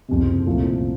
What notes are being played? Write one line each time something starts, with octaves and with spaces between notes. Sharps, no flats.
F#1 F2 C3
C2 A#2 F3 A3